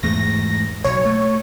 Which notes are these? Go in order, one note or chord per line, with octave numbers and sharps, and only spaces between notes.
E2 G#2 A3 A#6
B1 C#5
A3